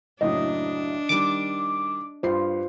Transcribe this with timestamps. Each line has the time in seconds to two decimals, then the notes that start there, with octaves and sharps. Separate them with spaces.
0.21 F#1 A2 F#3 D4 D#5
1.09 D#3 G3 D6
2.23 G2 F4 C5 C7